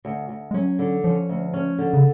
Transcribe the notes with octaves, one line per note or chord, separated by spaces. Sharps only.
D2
D2
G#3
F#3 C#4
D3
F3 C#4
D2
C#4
D3
C#3